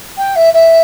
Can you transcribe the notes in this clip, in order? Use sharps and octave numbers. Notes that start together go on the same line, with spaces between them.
G5
E5
E5